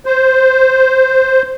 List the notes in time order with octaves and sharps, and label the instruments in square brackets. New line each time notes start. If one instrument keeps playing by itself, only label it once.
[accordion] C5